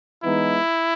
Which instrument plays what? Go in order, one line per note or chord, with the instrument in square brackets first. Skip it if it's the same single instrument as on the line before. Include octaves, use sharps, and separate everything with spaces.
[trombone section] E3 G#3 B3 D#4 [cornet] E4